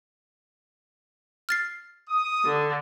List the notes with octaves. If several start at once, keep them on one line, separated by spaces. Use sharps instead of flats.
F6 A6 C7
D#6
D3